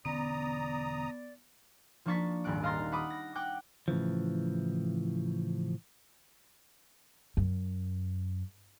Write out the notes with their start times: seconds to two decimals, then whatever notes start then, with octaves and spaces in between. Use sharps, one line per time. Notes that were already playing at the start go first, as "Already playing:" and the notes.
0.05 E1 D3 B3 C#4 D5 A#5 D#6
2.06 F3 A#3 D4 C#6 A6 B6
2.44 D#1 G#1 D#2 G3 F#6 D7
2.62 D#5 F5 A#5 C6 A6
2.92 F#5 B5 D6 D#6
3.10 A#6
3.35 F#5 G5 D6 F#6
3.88 A2 C#3 E3 F3
7.37 F#2